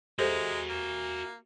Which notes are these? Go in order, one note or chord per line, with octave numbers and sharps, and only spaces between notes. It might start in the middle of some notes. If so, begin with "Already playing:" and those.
G#3 F#4 G4 A4 C5 E5
A#3